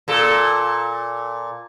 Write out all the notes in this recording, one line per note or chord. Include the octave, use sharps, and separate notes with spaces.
A#2 A4